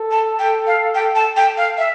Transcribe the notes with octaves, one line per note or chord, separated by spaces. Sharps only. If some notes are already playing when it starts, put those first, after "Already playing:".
Already playing: A4
A5
G5
F5
G5
A5
G5
F5
E5